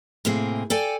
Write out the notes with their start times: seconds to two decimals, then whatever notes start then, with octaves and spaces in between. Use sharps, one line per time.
0.25 A2 C3 A#3 C4 G#4
0.70 A4 D5 G5 G#5